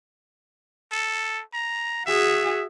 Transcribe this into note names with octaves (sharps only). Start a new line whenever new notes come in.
A4
A#5
F#4 G#4 E5